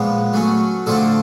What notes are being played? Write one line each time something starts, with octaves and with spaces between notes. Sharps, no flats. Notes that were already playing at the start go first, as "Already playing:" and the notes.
Already playing: A#2 F3 G#3 B3 B4
F#3 A3 C#4
D3 F3 A3 C4 F4 A4